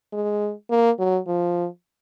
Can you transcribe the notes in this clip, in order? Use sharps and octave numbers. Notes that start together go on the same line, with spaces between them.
G#3
A#3
F#3
F3